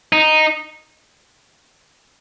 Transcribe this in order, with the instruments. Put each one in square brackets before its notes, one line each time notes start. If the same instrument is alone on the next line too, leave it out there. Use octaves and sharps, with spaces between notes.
[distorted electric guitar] D#4